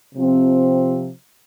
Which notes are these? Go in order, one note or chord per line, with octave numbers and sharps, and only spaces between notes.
C3 F3 C4